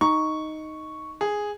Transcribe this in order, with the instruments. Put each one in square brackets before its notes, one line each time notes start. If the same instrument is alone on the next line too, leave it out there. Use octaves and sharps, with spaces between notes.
[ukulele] D#4 [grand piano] C#6
[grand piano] G#4